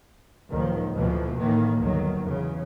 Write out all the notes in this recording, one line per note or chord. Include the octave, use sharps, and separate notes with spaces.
F#1 C#2 A2 D#3 F3
D2 B2 E3 F3
A2 D#3 E3 A#3
G1 D2 D#3 F#3
E2 C#3